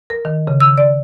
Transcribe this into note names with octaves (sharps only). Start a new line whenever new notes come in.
A#4
D#3
C#3
E6
D5